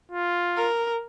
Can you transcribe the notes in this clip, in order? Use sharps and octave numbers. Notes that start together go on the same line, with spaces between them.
F4
A#4